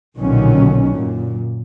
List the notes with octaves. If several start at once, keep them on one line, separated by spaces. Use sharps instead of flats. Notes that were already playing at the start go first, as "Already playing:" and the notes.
B1 A#2 D3 D#3 F#3 C#4
F#2 A#2